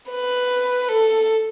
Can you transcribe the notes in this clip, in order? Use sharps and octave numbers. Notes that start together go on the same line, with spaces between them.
B4
A4